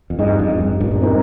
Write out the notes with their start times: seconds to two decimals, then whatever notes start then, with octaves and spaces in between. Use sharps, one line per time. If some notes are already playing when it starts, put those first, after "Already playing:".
0.10 F2
0.19 G2 D#4 G#4 D#5
0.39 F2
0.55 G#2
0.60 G2
0.80 G2 A#2
0.91 G2 A#2
1.01 C4 D#4 A#4